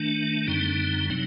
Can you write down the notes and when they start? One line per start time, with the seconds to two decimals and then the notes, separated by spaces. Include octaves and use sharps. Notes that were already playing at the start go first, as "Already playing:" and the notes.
Already playing: D#3 A3 D4
0.47 F#2 D3 G3 C4 D#4
1.10 C3 F#3 C4 D#4